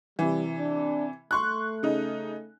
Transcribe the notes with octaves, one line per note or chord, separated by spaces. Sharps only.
C3 E3 G3
D4
A3 C6 C#6 F#6
C#3 D#4